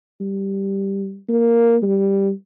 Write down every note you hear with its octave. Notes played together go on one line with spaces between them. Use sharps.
G3
A#3
G3